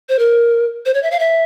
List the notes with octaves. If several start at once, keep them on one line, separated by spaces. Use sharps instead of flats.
C5
A#4
C5
C#5
E5
F5
E5